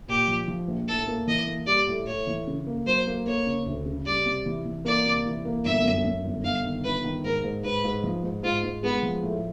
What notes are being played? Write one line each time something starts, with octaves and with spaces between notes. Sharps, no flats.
A#2 G4
F3
F3
A#1
A2 A4
A#3
E3 D#5
A#3
G3 D5
A2
A2 C#5
E3
C#3
A#3
F#3 C5
A#3
A#3 C#5
C#3
D2
C#3
G3 D5
C3
E3
E3
A#3 D5
C3
E3
A#3
G1 E5
F#2
F#2
G1
G1 F5
D#3
G1 B4
D#3
G#2 A#4
G#2
G#2 B4
G#2
F3
G#2
G#2 F4
G#2
G#3 B3
F3
A2